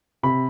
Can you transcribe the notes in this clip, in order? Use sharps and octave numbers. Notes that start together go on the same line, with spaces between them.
C3 B5